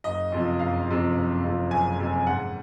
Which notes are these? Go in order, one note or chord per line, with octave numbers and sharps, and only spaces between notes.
F#1 D#5
F2 C3 F3
F#1 F5
F2 C3 F3
F#1
F2 C3 F3
F#1 G#5
F2 C3 F3
G#2 F#5